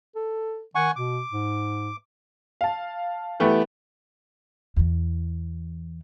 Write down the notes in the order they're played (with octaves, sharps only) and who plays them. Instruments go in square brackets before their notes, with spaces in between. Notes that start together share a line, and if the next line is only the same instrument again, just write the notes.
[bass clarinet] A4
[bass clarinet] D#3 [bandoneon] F#5 G#5 C#6
[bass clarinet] B2 [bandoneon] D6
[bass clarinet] G#2
[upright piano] F5 A5
E3 A3 B3 G4 B4
[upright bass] E2 E3